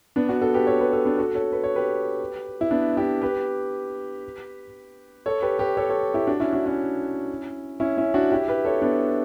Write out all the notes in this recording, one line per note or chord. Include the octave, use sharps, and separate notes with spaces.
B3 D4
D4 F#4
F#4 A4
G4 B4
A4 C#5
G4 B4
A4 C#5
B3 D4
F#4 A4
A4 C#5
B4
C#5
G4 B4
E4
B3 D4
E4 G4
G4 B4
A4 C#5
G4 B4
G4 B4
A4 C#5
A4 C#5
E4 G4
D4 F#4
C#4 E4
D4 F#4
C#4 E4
C#4 E4
C#4 E4
D4 F#4
E4 G4
G4 B4
A4 C#5
B3 D4